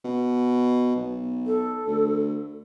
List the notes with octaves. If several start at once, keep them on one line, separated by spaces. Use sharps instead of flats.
B2
B1
A4
D2